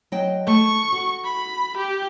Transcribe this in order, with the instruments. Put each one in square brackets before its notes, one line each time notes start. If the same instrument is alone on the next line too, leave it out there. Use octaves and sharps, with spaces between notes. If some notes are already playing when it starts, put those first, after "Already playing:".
[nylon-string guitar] F#3 D#5 G5
[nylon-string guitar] A3 [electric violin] C#6
[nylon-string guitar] F#4
[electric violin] B5
G4